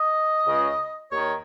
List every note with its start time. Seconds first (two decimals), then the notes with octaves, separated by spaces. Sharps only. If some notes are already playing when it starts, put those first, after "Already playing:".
Already playing: D#5
0.46 C#2 C#3
1.11 D#2 D#3 C#5